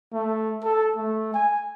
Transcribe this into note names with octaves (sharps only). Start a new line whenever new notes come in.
A3
A4
A3
G#5